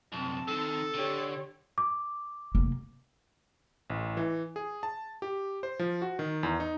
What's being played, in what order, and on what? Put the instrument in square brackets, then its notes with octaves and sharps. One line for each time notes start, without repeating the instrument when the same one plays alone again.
[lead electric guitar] C2 F#2 [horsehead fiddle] C4 A5
[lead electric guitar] D#3 [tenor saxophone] A4
[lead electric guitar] D3 [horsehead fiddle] G4 C#5
[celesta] D6
[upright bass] F1 A#3
[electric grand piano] A1
E3
G#4
A5
G4
C5
F3
F#4
D#3
E2
D#4